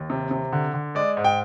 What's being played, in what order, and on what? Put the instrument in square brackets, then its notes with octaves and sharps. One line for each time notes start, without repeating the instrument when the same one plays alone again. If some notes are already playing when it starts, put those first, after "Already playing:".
Already playing: [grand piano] D#2
C3
C3
D3
D3
G#3 D5
G#2
G5